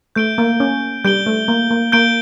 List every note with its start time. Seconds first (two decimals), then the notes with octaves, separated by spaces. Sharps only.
0.16 A3 G6 D7 G7
0.38 A#3
0.60 C#4
1.05 G3 G6 D7 G7
1.26 A3
1.48 A#3
1.71 A#3
1.92 A#3 G6 D7 G7